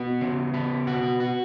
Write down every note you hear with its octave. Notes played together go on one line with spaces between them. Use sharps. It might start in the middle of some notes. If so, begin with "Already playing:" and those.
Already playing: B3 F#4
C#3
B3
F#4
F#4